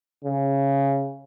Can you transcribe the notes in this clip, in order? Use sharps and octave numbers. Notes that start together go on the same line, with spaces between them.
C#3